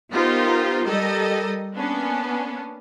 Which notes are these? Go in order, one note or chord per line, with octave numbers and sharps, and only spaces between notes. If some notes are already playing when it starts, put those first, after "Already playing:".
B3 D#4 F4 G4 A#4 C5
G3 G4 A4 A#4 D#5
A#3 B3 C#4 D4